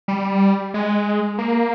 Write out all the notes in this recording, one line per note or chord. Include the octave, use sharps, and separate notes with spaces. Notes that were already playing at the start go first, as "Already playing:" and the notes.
G3
G#3
A#3